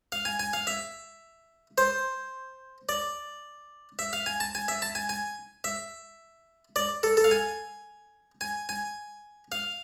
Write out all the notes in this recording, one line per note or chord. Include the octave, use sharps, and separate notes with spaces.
F5
G#5
G#5
F5
E5
C5
D5
E5
F5
G#5
A5
G#5
E5
A5
G#5
G#5
E5
D5
A4
A4
F5
G#5
G#5
G#5
F5